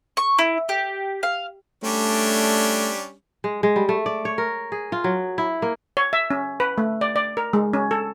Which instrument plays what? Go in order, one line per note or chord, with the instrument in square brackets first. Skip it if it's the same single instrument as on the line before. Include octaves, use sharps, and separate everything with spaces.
[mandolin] C#6
E4
G4
F5
[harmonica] G3 C#4 D4 [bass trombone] A3
[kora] G#3
G#3
G3
A3
D5
C#5
A#4
G#4
F4
F#3
E4
A#3
[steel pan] C#5
E5
C#4
B4
A3
D5
D5
A#4
G#3
C#4
A4